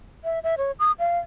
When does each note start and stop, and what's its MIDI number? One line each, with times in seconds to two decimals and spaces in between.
0.24 0.39 76
0.44 0.55 76
0.58 0.72 73
0.79 0.92 87
0.99 1.19 77